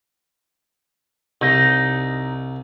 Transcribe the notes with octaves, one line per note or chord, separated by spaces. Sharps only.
C2 D#4